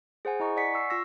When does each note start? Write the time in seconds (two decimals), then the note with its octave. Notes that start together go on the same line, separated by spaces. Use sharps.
0.25 G#4 C5 F#5 G#5
0.40 E4 D#5 A#5 C#6
0.57 D5 F#5 G#5 B6 C#7
0.74 C#6 E6 C7
0.90 F4 C#6 E6 A#6